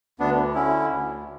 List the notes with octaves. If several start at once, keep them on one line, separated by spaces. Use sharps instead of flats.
D2 B3 D4
D3 C#4 E4
D2